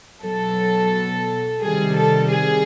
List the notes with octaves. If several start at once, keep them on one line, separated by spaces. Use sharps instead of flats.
B2 F#3 A4
C3 D#3 G3 G#4
A4
G#4